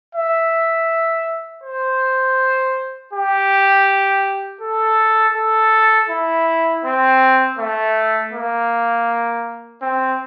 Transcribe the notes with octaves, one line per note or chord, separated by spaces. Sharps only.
E5
C5
G4
A4
A4
E4
C4
A3
A#3
C4